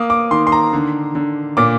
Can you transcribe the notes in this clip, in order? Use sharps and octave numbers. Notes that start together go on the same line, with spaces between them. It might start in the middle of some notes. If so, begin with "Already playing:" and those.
Already playing: A#3 D#6
D6
D#3 C6
C6
A#5
D3
D3
A#2 D6